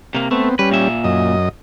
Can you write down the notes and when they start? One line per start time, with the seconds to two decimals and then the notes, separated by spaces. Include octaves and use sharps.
0.15 C3 A#3
0.31 A3 B3 C4
0.59 G3 C#4 B4
0.71 A#2 E5
1.04 F#2 D#5